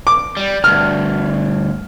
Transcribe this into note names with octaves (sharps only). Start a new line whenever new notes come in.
D6
G3
D2 G2 F6